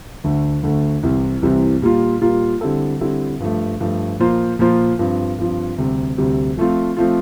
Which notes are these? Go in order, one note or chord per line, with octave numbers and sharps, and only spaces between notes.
D2 D3 A3 D4
D2 D3 A3 D4
C2 C3 E3 G3 C4
C2 C3 E3 G3 C4
A#2 G3 A#3 F4
A#2 G3 A#3 F4
D3 G3 C4 E4 A4
D3 G3 C4 E4 A4
G2 F3 A3
G2 F3 A3
A#2 F3 A#3 F4 C5
A#2 F3 A#3 F4 C5
G2 F3 C4 F4
G2 F3 C4 F4
D2 C3 G3 C4
D2 C3 G3 C4
F3 A3 C4 F4
F3 A3 C4 F4